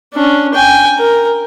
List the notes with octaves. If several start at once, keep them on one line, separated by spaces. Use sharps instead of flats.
C#4 D4
G5 G#5
A#4